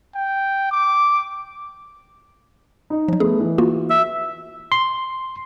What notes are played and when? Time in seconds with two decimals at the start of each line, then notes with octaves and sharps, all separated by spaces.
0.15 G5
0.71 D6
2.90 D#4
3.08 F3 F#3
3.20 A3 B3 G#4
3.40 E3
3.58 A#3 F4 F#4
3.90 E5
4.72 C6